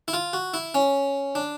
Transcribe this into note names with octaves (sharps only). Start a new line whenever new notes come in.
E4
F4
F#4
E4
C#4
D4